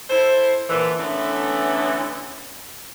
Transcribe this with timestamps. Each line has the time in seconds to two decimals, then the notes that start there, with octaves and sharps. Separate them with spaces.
0.10 E4 A4 C5
0.70 A#2 D3 E3
0.99 D3 E3 A3 B3 C#4